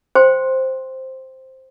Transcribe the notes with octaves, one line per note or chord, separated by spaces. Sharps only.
C5 G5 C6